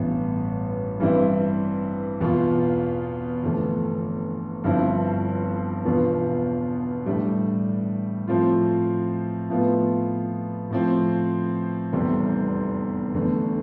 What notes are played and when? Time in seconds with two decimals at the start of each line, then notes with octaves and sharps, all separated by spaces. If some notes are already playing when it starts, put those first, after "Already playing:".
Already playing: A1 G2 E3 B3
1.00 G2 E3 G3 C4 E4
2.21 E2 B2 B3 F4
3.43 G1 F2 E3 A3
4.64 G1 G2 F3 C4 E4
5.85 E2 B2 B3 D4 F4
7.06 A2 G3 D4
8.28 A2 F3 C4 F4
9.50 A2 F3 B3 F4
10.70 A2 F3 C4
11.93 F1 E2 C3 G3 C4
13.14 E2 D3 A3